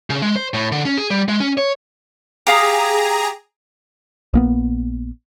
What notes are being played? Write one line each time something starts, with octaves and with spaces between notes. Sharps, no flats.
C#3
G#3
C5
A2
D3
C#4
G#4
G3
G#3
C#4
C#5
G4 G#4 F5 A#5 D#6
A#1 A#3 B3